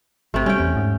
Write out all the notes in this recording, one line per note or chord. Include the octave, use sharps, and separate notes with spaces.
G#1 C3 A3
G3 C#4 G5
E2
G#2